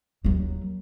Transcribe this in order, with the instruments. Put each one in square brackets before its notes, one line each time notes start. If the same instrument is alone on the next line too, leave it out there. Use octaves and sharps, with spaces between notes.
[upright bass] D#2 F#3